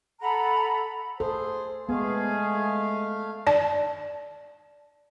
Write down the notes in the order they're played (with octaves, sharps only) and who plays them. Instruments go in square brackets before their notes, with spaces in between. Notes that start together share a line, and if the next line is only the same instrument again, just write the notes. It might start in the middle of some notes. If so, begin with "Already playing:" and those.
[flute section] A4 F#5 A#5 B5
[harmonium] G#4 [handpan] A4 [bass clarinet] C5
[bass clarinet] G#3 [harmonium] A3 F5 [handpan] B3 [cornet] G#4
[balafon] D5 A5